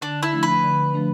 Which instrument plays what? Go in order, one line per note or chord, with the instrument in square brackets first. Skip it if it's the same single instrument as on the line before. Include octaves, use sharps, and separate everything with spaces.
[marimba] D3 [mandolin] D4
[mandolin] E4
[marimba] F3 A3 D4
[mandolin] B4
[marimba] D3
F3 A3 D4